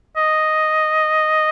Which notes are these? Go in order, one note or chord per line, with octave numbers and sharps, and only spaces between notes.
D#5